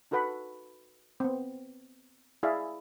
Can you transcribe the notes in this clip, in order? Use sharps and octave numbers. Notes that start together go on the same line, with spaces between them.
D#4 F#4 A4 B4 F#5 B5
B3 C4
E4 G#4 D5 E5 F5